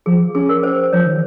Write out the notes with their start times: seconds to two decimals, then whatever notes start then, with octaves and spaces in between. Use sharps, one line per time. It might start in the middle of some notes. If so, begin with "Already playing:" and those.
0.06 F3 G#4
0.35 C#4 G#4
0.49 A#4
0.63 C5
0.93 F3 C#5
1.06 D#3